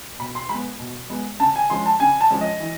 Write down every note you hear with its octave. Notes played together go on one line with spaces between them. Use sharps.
B2 B5
C6
G#3 B3 B5
B2
G#3 B3
C#3 A5
G#5
F3 G#3 C#4 C6
A5
C#3 G#5
A5
F3 G#3 C#4
D#5
E3